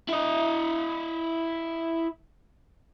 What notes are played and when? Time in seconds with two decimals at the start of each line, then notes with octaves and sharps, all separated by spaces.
0.09 E4 D#5